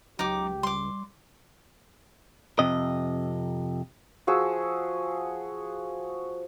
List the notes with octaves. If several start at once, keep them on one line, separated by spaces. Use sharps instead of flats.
C#2 F#3 D#4 G4 D6
G3 C6 D6
F2 C3 D#5
F3 F#4 G#4 E6